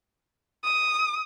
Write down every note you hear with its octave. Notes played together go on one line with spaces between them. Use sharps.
D#6